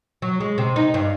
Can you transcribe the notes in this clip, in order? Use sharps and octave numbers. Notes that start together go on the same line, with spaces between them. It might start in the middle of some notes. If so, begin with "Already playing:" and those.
F#3
G#3
C3
D#4
G2